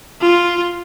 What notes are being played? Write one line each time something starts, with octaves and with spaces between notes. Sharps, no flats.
F4